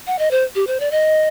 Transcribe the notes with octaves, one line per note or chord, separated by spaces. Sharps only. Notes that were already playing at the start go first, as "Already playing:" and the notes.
F#5
D#5
C5
G4
C5
D5
D#5